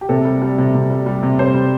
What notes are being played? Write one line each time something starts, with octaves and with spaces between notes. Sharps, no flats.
G4
C3 A4
G3
G3
C3
C3
G3
G3
C3
C3 C5
G3